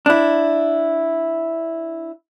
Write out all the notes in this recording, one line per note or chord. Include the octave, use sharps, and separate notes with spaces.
D4 E4